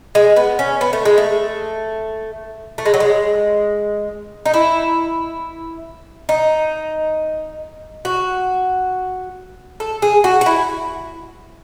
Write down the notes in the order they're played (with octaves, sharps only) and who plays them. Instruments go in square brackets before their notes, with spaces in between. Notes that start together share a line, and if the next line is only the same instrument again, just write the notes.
[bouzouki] G#3
B3
C#4
B3
A3
G#3
A3
A3
G#3
F#3
G#3
D#4
E4
D#4
F#4
A4
G#4
F#4
F#4
E4